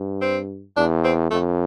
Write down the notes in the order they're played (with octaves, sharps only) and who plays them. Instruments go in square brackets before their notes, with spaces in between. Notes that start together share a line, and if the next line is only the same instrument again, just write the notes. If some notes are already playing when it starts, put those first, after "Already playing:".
Already playing: [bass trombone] G2
[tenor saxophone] C4
[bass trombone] E2 [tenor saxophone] D4
[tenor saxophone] C4
[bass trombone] F2 [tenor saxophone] A3